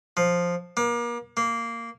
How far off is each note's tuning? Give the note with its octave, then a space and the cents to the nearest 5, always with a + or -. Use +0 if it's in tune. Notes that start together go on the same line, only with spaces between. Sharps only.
F3 +5
A#3 +35
A#3 -10